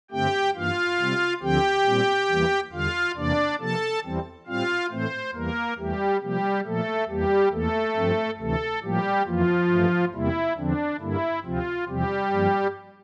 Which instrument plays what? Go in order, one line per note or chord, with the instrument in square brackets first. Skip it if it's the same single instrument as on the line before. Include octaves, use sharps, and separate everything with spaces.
[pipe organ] G2 D3 A3 C4 G4 G5
G2 E3 A#3 F4 F5
C3 G3 C4
D2 D3 F3 C4 G4 G5
A#2 G3 C4
E2 E3 G3 A#3
E2 D3 G3 F4 F5
E2 C3 E3 A#3 D4 D5
C3 F3 A#3 A4 A5
E2 E3 G3 C4
A2 G3 C4 F4 F5
A2 E3 A3 C4 C5
E2 E3 G3 A#3 A#4
E2 E3 G3 A3 G4
C3 F3 G3 A#3 G4
A#2 F3 A3 A#3 A4
E2 E3 G3 A#3 G4
E2 E3 A3 A#3 A4
G2 F3 C4
D2 C3 E3 A3 A4
A2 F3 G3 A#3 G4
F2 E3 F3 A#3 F4
G2 E3 A3
E2 C3 G3 A#3 E4
E2 D3 F3 C4 D4
G2 D3 G3 A#3 E4
D2 C3 F3 C4 F4
E2 C3 F3 G3 C4 G4
G2 F3 A#3